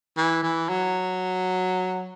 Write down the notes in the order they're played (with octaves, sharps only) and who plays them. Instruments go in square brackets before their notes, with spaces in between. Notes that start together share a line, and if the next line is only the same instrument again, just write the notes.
[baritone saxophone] E3
E3
F#3